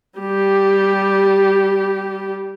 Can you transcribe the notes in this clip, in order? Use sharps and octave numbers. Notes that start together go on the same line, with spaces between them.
G3 G4